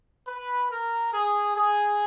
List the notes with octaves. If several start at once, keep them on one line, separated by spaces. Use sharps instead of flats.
B4
A#4
G#4
G#4